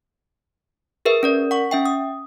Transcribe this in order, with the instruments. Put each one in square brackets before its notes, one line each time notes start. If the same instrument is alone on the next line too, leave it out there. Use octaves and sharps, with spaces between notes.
[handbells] G#4 A#4 B4 E5
C#4 A#4 D5
F#5 C#6
C#4 E5 G5
D#6